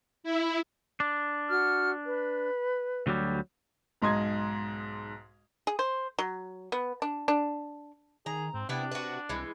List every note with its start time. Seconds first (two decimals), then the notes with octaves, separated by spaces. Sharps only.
0.24 E4
1.00 D4
1.49 F#4 F6
2.06 B4
3.07 D2 F#3 G3
4.02 B1 G#2 D#5 C6 D#6 G#6
5.67 G#4
5.79 C5
6.19 F#3
6.72 B3
7.02 D4
7.28 D4
8.26 D#3 G#4 A#5
8.54 G#2 C4
8.69 C3 B3 D4 E4 G4
8.91 F#4 B4
9.29 C2 E3 G#3